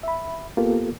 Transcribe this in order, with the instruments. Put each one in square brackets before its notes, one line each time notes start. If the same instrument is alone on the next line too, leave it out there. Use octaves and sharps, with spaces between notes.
[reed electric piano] E5 B5
A#3 B3 F4 G4 A4 A#4